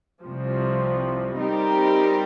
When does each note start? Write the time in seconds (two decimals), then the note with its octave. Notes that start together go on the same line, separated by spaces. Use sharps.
0.23 C2 C3 F3
1.39 G3 C4 D#4 G4 A#4